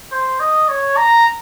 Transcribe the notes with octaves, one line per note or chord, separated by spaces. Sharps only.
C5
D#5
C#5
A#5